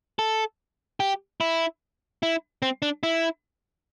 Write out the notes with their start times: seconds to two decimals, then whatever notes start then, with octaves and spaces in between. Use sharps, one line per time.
0.19 A4
1.00 G4
1.41 E4
2.23 E4
2.62 C4
2.82 D4
3.03 E4